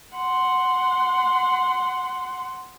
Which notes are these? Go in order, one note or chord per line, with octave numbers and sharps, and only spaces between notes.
F#5 C6